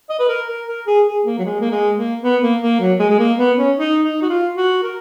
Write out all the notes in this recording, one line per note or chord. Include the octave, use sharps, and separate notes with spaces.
D#5
B4
A#4
A#4
A#4
G#4
G#4
A#3
F#3
G#3
A#3
G#3
A#3
B3
A#3
A#3
F#3
G#3
G#3
A#3
B3
C#4
D#4
D#4
F#4
F4
F#4
A#4